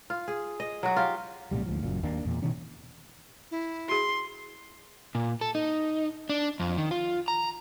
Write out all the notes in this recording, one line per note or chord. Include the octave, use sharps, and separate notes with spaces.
F4
G#4
D#5
F#3 F#4
F4 G4
B1 A2 C3 G3
D2 G#2 F3
F#1 F#2 A#2
D#2 A#3 D4
E2 A#2
B2 D#3 E3 C#4
E4
F#4 G#4 C6
A#2
A4
D#4
D4
F2
D#3
F4
A#5